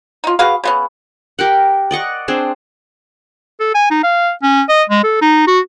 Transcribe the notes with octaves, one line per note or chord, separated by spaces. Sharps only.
D#4 F4
F#4 G#4 B4 F5
C#3 B3 C#4
G4 A#4 F#5
D5 D#5 F#5 C#6
C4 D4 G#4 C5
A4
G#5
D#4
F5
C#4
D#5
G#3
A4
D#4
F#4